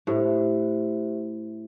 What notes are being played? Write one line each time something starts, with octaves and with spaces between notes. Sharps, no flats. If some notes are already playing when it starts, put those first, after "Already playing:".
A2 G4 C5 E5